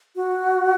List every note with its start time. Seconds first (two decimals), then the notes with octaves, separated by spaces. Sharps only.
0.16 F#4